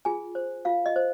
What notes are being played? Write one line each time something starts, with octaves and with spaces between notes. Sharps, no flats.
F4 G#4 G#5
C5
F4 F5
D#5
C5